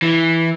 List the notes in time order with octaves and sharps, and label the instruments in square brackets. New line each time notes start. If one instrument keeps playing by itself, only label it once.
[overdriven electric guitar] E3